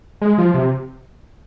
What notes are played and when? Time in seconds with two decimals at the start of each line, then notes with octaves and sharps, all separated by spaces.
0.21 G#3
0.38 F3
0.54 C3